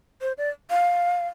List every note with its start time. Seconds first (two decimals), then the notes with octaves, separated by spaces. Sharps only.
0.21 C5
0.38 D5
0.70 F5